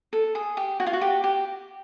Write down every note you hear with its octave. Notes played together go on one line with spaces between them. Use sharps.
A4
G#4
G4
F#4
F4
F#4
G4
G4